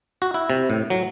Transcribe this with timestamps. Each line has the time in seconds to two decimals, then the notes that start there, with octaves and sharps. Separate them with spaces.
0.22 F#4
0.34 E4
0.50 C3
0.70 A2
0.90 F#3